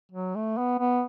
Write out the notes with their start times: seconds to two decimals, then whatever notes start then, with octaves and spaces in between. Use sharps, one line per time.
0.12 F#3
0.35 A3
0.57 B3
0.79 B3